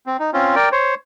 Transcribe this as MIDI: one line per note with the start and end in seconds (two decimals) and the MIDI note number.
0.06 0.17 60
0.19 0.31 63
0.33 0.55 60
0.33 0.55 61
0.33 0.55 65
0.55 0.69 70
0.55 0.69 74
0.55 0.69 79
0.72 0.95 72
0.72 0.95 73